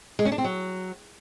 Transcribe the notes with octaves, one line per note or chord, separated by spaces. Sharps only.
G#3
C#4
D4
C4
F#3